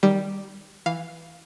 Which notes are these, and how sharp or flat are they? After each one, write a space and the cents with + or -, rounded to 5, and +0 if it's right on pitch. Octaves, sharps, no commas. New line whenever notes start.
D#3 +0 G3 +0
E3 +0 F5 +0